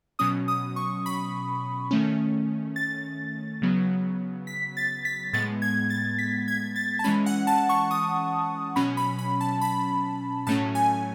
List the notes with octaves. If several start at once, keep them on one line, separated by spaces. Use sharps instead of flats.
B2 F#3 C#4 D#6
D#6
C#6
B5
D#3 A3 C#4
A6
C#3 F#3 B3
B6
A6
B6
A2 G#3 B3 A6
G#6
A6
B6
G#6
A6
A5
E3 G#3 C#4 B5
F#5
A5
C#6
D#6
B2 F#3 C#4 B5
B5
B5
A5
B5
A2 F#3 A3 C#4 A5
G#5